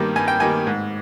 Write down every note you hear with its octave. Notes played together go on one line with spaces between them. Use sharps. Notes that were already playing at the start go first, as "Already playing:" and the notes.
Already playing: G2 D#3 G3 A#3
G2 G#5
G5
D#3 G3 A#3 G#5
G#2